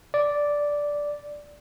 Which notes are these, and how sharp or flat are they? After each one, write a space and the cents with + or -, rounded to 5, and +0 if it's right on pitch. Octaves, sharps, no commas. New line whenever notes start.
D5 -5